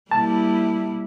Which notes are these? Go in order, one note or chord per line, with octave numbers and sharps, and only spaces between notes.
G3 A#3 E4 A5